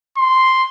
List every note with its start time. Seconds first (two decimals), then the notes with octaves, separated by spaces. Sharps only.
0.17 C6